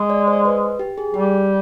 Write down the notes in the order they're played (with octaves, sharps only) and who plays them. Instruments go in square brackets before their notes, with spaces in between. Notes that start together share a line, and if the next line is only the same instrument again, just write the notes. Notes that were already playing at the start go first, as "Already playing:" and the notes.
Already playing: [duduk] G#3
[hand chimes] D5
C5
B4
G4
G#4
[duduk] G3 [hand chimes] G4